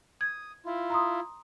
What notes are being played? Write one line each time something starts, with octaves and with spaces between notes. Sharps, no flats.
D#6 G#6
E4 F4
A#5 C6 D#6